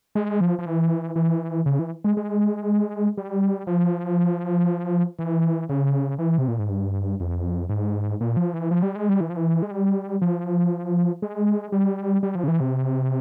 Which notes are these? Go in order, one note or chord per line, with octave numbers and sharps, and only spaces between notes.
G#3
F3
F3
E3
E3
C#3
E3
G#3
G#3
G3
F3
E3
C#3
E3
C3
A#2
G#2
G2
F2
G#2
A#2
F3
E3
F3
G3
G#3
G3
E3
F3
E3
G#3
G3
F3
G#3
G3
G3
F3
C#3
E3
C3